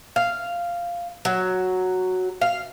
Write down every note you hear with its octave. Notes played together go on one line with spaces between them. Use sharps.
F5
F#3
F5